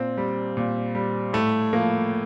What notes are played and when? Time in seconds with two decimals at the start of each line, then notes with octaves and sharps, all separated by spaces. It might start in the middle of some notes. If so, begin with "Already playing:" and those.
Already playing: A#2 C4
0.17 G3
0.57 A#2
0.95 G3
1.33 A2 A3
1.73 F3 A#3